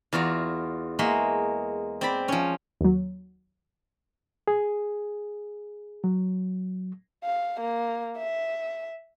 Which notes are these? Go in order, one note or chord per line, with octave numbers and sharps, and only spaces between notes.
E2 F4 F#4 D5 A#5
G#3 A#3 F#4 E5 C6
C4 D5 B5
F3 C#4
D#2 F#3
G#4
F#3
F5
A#3
E5